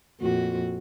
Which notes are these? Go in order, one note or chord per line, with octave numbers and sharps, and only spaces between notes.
F2 A#2 F#4